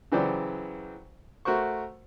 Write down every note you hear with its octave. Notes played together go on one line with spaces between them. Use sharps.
C#3 E3 F#3 G4 C5 D5
A3 F#4 A#4 C5 C#6